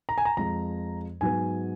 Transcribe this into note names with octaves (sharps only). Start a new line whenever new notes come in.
A#5
G#5
A#5
F2 F3 G#3 A#5
G#2 F#3 B3 G#5